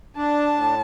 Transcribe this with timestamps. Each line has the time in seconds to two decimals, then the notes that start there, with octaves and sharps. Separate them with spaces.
0.16 D4 A5
0.54 A2